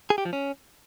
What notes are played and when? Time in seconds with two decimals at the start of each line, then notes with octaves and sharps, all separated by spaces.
0.10 G#4
0.18 G4
0.25 F3
0.33 C#4